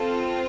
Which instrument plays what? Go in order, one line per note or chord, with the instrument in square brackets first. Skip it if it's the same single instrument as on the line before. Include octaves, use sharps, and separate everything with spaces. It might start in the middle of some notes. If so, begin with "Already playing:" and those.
Already playing: [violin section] C4 F4 A4